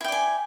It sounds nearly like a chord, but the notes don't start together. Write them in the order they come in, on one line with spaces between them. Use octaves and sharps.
E4 G5 D5 G#5